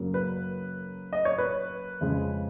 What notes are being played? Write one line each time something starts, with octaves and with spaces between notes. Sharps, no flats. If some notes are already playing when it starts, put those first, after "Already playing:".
Already playing: F#2 C#3 F#3 A#3
B4
D#5
C#5
B4
F2 C#3 G#3